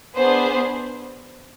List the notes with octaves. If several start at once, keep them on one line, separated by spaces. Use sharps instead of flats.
B3 D4 G#4 C5